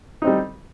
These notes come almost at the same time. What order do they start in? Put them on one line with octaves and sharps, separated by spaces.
D#4 C4 G3